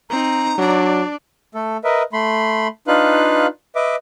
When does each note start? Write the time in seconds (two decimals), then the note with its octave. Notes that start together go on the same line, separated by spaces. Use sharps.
0.10 C4 D#4 A#5
0.58 F#3 D4 D5
1.55 A3 A4
1.84 A#4 B4 D#5 E5
2.13 A3 B5 C6
2.87 D4 D#4 F4 B4 F5 F#6
3.75 B4 D#5 E5 D6